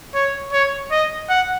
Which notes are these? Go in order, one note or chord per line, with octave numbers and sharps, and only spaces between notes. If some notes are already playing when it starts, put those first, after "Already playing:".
C#5
C#5
D#5
F#5